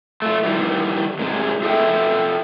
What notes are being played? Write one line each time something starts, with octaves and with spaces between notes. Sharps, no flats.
A3 F4
D#3 E3 G3
G#2 C3 G#3
F4 A4 D#5 E5 G5